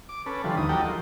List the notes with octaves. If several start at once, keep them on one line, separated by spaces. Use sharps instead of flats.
D6
C#4 A4 B4
D3 E3 F3 G3
D#2 E3 D#6
G3 F#4 A4 A#4 D#5 G5
F3